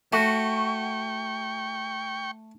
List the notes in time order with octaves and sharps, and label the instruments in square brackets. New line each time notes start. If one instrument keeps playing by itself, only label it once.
[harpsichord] A3 [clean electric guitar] F#4 [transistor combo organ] G5 C#6